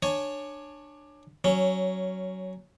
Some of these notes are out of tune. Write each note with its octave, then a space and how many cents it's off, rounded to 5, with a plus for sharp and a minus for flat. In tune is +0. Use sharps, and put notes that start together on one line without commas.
D4 +20 C#5 +0 G#5 +10
F#3 +15 C#4 +0